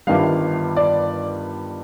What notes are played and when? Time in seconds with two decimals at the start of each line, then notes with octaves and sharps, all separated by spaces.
0.07 G1 G2 D#3 G3 F5
0.76 D5